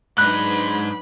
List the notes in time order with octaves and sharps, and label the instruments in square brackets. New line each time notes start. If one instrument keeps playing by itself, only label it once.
[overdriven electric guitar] G#2 D#4 [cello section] F#3 D4 B4 [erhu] B5 [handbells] F#6